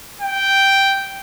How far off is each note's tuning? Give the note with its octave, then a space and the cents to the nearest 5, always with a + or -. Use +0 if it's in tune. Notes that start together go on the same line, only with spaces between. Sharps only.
G5 -5